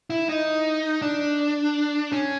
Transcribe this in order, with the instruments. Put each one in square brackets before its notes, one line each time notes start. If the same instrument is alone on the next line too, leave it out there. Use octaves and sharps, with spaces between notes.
[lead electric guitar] E4
D#4
D4
C#4